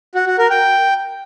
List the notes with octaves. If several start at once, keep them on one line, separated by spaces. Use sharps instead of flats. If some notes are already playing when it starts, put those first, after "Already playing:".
F#4
F#4
A#4
G5